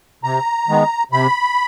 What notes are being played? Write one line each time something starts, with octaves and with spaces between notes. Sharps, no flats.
C3 A#5
D#3 G#3 B3
C3 B5